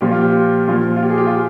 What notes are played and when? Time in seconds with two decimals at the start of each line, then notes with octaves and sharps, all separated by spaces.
0.01 A#2 F3 G4
0.11 F4
0.21 G4
0.68 A#2 F3 F4
0.96 F4
1.03 G4
1.10 G#4
1.18 G4
1.27 F4